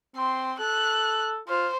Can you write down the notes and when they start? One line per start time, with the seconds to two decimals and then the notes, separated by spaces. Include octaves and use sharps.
0.16 C4 C6
0.60 A4 F#6
1.49 F4 C5